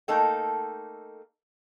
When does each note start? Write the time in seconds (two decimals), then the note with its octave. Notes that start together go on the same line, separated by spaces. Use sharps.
0.08 A3 A#3 D#4 A4 G5